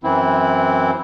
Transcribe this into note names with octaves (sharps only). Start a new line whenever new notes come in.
F#2 E3 C4 E4